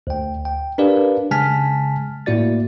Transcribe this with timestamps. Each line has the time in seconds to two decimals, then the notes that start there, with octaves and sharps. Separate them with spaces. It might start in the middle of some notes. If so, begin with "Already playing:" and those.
0.07 D2 G5
0.45 G5
0.78 D4 G4 A#4 B4 D5 F5
1.31 C#3 G#3 G#5 A5 F6 B6
2.26 A2 A#3 E4 F#4 D5 A6